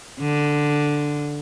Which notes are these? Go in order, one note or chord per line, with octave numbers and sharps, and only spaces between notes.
D3